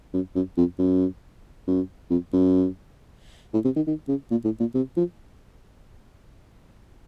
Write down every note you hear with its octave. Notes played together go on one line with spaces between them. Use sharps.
F#2
F#2
F2
F#2
F#2
F2
F#2
A2
C3
D#3
D#3
C#3
A#2
A2
A#2
C3
F3